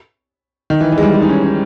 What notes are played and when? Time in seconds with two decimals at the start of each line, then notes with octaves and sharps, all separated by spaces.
0.70 D#3
0.81 E3
0.92 E3
0.98 G#3
1.03 G3
1.14 G#3
1.22 D#4
1.29 C#4
1.43 C#4